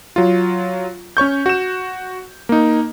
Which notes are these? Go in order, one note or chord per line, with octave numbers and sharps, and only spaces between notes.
F#3 F4
C#4 C#5 C#6 G6
F#4 E7
A#3 D#4